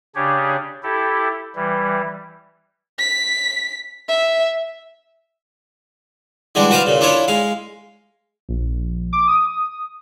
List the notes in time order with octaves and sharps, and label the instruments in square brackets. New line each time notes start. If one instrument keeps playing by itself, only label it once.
[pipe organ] C#3 D4 G4 G#4 C#5
E4 G4 A4
E3 G3
[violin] B6
E5
[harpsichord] D3 E3 G3 G#3 D4
F#4 B4 C5 D5 F5
A#2 C#3
D4 E4 F4 A4 C#5
G#3 F5
[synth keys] A#1
D6
D#6